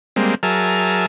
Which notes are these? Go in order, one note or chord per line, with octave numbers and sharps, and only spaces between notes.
G3 G#3 A#3 C4
F#3 G#4 A#4 E5 A5 F6